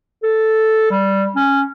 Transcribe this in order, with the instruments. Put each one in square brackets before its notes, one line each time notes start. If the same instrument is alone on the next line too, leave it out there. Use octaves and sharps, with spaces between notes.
[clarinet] A4
G3
C#4